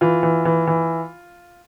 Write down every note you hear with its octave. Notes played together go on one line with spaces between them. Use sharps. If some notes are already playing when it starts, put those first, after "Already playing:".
E3 F4
E3
E3
E3